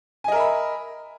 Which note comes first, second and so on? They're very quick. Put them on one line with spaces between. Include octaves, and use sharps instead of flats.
G#5 D#5 A#4 E5 B5